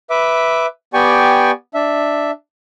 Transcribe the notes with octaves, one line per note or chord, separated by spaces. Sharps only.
B4 E5 D6
B3 G4 D5 G5 G#5 C#6
D4 E5